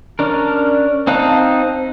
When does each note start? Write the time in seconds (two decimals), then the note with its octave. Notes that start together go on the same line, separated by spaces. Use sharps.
0.19 C#4 D4 A#4
1.07 C4 D#4 F5 A5 F#6